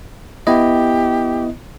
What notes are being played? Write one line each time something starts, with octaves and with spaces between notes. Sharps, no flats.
B3 E4 G4 D#5